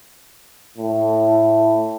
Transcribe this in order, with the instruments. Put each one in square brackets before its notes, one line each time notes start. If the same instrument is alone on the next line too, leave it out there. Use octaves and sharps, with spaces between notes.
[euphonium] A2